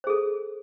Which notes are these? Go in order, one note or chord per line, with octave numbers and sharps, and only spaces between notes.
G#4 A4 C5